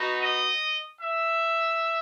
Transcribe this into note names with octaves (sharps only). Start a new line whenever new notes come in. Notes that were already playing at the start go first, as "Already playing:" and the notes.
Already playing: B3 D#4 F#4
D#5
E5